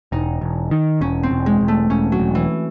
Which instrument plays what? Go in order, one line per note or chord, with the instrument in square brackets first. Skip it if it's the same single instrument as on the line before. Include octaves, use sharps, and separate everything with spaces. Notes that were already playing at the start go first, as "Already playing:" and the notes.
[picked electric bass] E1 [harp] D#4
[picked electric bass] E1
D#3
[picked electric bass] E1 [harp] C#4
[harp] C4
[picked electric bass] E1
[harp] G#3
[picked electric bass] E1
[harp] A3
[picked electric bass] E1 [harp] C#4
[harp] F#3
[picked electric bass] E1
[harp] E3